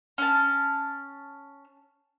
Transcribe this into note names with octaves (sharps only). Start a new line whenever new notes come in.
C#4 A5